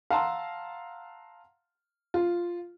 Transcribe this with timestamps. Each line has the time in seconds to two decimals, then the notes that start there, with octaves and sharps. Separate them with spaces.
0.10 F5 F#5 A5 A#5 C6 E6
2.14 F4